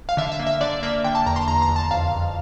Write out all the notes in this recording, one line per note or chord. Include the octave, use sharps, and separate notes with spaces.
F5
D3 E5
E5
A#3
E5
D3 D5
A#3 E5
D3 G5
A5
E2 A#5
C6
E2 A#5
A#5
E2
A5
F2 F5
F2